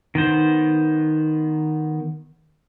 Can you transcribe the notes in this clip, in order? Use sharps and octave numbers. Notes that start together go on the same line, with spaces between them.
D#3 B3 C5